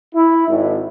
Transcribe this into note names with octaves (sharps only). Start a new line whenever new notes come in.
E4
G#1